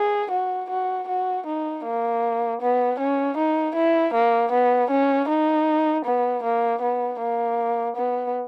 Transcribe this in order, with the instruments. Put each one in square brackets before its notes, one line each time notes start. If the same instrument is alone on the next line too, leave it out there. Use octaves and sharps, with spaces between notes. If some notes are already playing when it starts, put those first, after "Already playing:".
Already playing: [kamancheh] G#4
F#4
F#4
F#4
D#4
A#3
B3
C#4
D#4
E4
A#3
B3
C#4
D#4
B3
A#3
B3
A#3
B3